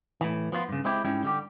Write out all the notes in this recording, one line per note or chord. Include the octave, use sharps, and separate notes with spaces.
A2 E3
F3 B3 F4 C5
G2 C#3
G#3 C4 E4 G4
G#2 G3 C#4 E4 G5
D3 G3 G4